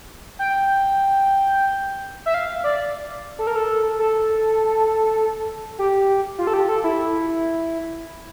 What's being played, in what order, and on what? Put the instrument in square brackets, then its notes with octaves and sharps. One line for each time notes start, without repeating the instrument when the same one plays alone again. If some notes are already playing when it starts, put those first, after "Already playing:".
[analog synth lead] G5
E5
F5
D5
A4
A#4
A4
A4
G4
F4
A4
G4
A4
E4